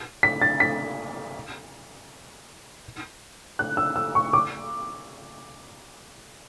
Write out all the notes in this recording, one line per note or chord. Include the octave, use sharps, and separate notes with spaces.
B6
A6
B6
F#6
E6
E6
C#6
D6